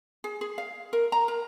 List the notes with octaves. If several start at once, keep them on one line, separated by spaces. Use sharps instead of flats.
G#4
G#4
F5
A#4
A#5
A#4